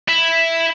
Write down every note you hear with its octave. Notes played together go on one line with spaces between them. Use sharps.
E4